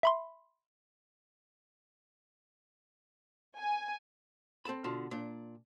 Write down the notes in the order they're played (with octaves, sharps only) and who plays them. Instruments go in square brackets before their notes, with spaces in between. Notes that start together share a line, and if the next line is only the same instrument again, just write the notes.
[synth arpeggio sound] E5 B5 C6
[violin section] G#5
[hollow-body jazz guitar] C4 A4 A5 B5
B2 D3 F4 A5
A#2 D4